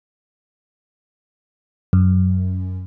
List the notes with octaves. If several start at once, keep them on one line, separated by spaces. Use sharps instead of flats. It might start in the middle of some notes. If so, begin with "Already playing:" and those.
F#2